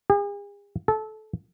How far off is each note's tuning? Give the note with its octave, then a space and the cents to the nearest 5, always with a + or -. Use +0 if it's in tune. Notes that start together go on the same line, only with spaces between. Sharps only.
G#4 -45
A4 -20